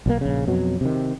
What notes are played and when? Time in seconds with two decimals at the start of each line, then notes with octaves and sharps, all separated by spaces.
0.06 B1 F3 A#3
0.21 A#1 C#3
0.47 F2 B2 F#3
0.81 C3 D#3